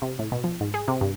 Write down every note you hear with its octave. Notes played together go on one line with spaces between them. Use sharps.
C3
A2
B2
F3
G#2
G#4
C3
G2